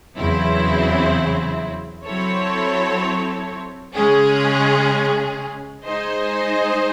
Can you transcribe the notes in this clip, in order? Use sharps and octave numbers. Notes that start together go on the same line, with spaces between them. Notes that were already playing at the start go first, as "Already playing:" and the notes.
E2 C#3 F#3 C4 E4
F#3 C4 E4 A4 C#5
C#3 G#3 C#4 G#4
G#3 D#4 G#4 C5 D#5